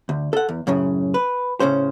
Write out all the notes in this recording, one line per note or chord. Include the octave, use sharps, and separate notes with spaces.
D2
A4 F#5
E2
F#2 A2 C#3
B4
A2 C#3 C#4 C5